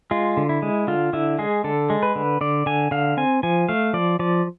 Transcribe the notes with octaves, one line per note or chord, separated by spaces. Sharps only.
G#3 F4
D3
E4
G#3
D3 F4
D3 E4
G#3 G#4
D3 A4
G#3
B4
D3
D3 D5
D3 G#5
D3 F5
C4 G#5
F3 G#5
A3 F5
F3 D5
F3 D5